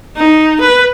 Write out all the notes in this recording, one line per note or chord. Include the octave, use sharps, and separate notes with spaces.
D#4
B4